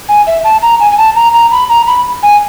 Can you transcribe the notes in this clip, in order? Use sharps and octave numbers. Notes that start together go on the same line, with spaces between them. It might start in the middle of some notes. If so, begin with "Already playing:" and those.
G#5
E5
A5
A#5
G#5
G#5
A5
A#5
A#5
B5
A#5
B5
G#5